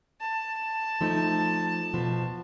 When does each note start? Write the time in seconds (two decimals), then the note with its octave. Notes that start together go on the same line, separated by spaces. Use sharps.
0.20 A5
1.01 F3 A3 D#4
1.94 B2 F3